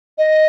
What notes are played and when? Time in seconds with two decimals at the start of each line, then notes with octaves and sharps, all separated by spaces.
0.18 D#5